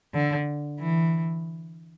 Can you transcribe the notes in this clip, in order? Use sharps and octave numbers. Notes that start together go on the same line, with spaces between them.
D3
E3